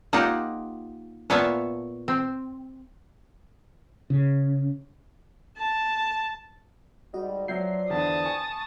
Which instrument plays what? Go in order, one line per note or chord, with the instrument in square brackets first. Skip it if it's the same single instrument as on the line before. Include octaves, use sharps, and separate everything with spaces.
[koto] A#3 D#4 F4 G4 F#5
A#2 B3 C#5 E5 F5 A5
C4
[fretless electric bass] C#3
[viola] A5
[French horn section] G#2 G3 [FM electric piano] F#4 D#5
[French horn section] F3 C5 D5 [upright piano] F#3 G6 [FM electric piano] E5 C7
[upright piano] E2 D3 [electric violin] A5 D#6
[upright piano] G#5 [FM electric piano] C#6